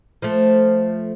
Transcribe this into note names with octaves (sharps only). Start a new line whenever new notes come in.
F3 A3